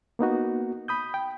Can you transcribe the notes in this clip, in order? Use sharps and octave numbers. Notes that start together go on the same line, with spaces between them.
A#3 B3 D#4 F#4
B5 D#6 G6
G5